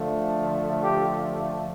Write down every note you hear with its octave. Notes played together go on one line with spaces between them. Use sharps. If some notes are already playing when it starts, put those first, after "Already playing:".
Already playing: D3 F3 A3
G4